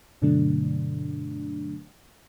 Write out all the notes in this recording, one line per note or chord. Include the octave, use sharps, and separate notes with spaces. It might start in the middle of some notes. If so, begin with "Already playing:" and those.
G2 B2 D3 F#3 A3 D4